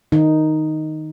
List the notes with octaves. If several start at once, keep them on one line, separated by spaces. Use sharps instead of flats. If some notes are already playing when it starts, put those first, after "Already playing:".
D#3 D#4